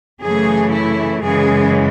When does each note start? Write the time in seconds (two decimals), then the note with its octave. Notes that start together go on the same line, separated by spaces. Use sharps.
0.21 F#2 C#3 E3 A3 G#4
0.72 E4
1.23 F#2 C#3 E3 G#3 G#4